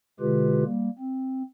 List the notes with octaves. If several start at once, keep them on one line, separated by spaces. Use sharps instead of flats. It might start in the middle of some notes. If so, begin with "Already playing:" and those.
B2 D3 G#3 F4 G4 B4
G3 A#3
C4